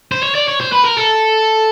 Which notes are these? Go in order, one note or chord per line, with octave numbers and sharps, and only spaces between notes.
C5
C#5
D5
C#5
C5
B4
A#4
A4